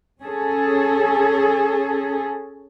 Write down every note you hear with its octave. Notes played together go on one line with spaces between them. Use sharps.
C#4 G#4 A4